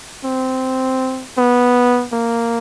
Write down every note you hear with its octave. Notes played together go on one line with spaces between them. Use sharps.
C4
B3
A#3